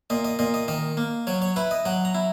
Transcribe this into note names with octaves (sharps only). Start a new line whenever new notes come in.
A#2 D#5
D#5
A#2 D#5
D#5
D#3 D#5
A#3
F#3 C#5
C#5
E4 B4
D#5
F#3 F#5
A#5
E4